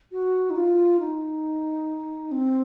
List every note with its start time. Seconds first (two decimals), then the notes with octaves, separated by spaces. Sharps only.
0.12 F#4
0.50 D#4
0.56 F4
0.99 D#4
2.32 C4